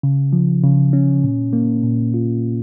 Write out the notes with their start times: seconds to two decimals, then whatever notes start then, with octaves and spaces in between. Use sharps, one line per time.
0.03 C#3
0.33 F3
0.63 C#3
0.93 C#4
1.23 A#2
1.53 A#3
1.83 A#2
2.14 F4